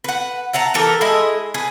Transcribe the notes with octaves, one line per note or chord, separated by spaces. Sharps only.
B4 F#5
E5 F#5 A5 A#5
E3 G4 A4 A#4
G#3 E4 D#5 E5
G#4 B4